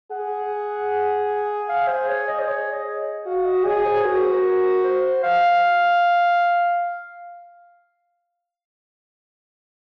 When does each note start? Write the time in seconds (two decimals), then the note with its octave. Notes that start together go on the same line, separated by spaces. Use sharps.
0.11 G#4 F#5
1.69 F5
1.88 C5
2.08 C#5
2.28 D#5
2.39 C5
2.48 C#5
2.74 D#5
3.26 F#4 F5
3.46 D#5
3.65 G#4 C#5
3.85 C5
4.04 F#4 A#4
4.18 C5
4.32 A#4
4.84 C5
5.23 F5